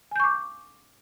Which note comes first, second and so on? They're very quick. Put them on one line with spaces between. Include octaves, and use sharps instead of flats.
G#5 G6 C#6 D6